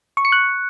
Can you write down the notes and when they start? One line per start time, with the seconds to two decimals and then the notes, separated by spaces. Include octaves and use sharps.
0.17 C#6
0.25 C#7
0.32 F#6